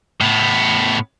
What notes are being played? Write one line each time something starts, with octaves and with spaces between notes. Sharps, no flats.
A2 B3